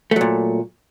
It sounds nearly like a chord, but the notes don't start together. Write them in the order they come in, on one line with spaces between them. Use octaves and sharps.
A3 F#3 A#2